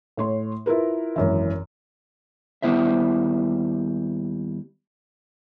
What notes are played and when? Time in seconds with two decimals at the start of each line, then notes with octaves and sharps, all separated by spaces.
0.17 A2 C#5 C6
0.66 E4 F4 A#4 B4
1.16 G#1 F#2 E3
2.62 D#2 G3 B3 E4 C5 E5